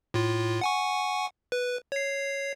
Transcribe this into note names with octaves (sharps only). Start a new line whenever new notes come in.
A2 F4
F#5 G#5 C#6
B4
C#5 C7